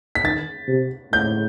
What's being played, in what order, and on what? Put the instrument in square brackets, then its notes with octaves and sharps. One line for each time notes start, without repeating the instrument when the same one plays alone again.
[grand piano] B6
[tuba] D#3 [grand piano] A6
[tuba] C3
[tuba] A2 [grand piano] G6